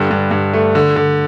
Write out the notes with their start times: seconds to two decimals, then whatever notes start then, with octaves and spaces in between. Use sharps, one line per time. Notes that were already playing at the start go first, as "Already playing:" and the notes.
Already playing: G2 D3
0.11 G2
0.31 G2
0.53 A3
0.75 D3
0.96 D3